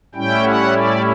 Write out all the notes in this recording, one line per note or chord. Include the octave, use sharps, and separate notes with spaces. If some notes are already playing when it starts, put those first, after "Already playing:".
A2 G3 C#4 E4 G5
F#5
D5